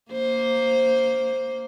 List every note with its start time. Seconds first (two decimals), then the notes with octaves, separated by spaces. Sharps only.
0.12 A#3 C5